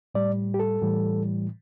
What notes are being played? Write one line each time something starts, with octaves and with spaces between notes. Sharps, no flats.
A2 G3 D5
G4
A4
A2 E3 G3